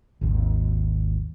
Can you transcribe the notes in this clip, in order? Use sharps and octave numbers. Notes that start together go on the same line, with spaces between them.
G#1 D#2